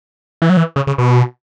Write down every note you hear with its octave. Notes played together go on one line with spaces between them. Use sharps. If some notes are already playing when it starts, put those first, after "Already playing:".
E3
F#3
E3
C#3
C#3
B2